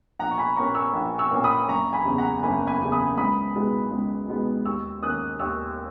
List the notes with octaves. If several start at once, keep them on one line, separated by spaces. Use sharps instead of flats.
A#1 F#5 A#5
C#6
G#5 B5
A#2 A#3 C#4 A#5 C#6
C#6 E6
A#1
C#6 E6
A#2 A#3 C#4
B5 D#6
F#1 A#5 C#6
G#5 B5
E2 C#3
F#5 A#5
F#1 G#5 B5
G#5 B5
E2 C#3
B5 D#6
C#2 B5 D#6
B2 G#3 B3 D#4
C#2
B2 G#3 B3 D#4
D#2 C#6 E6
D#3 A#3 C#4 D#6 F#6
D#2 C#6 E6